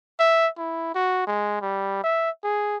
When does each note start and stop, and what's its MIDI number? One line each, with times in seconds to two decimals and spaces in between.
0.20 0.48 76
0.58 0.91 64
0.95 1.23 66
1.27 1.61 56
1.61 2.01 55
2.03 2.30 76
2.44 2.77 68